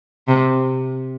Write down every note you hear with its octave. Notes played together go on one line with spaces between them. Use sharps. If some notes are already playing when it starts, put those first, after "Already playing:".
C3